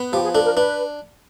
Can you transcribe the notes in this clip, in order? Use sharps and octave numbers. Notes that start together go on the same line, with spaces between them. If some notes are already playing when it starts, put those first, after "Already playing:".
Already playing: B3
F3 G4
G#4
D4 A4
A#4
D4 B4